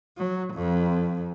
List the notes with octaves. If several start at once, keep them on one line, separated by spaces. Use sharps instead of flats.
F#3
F2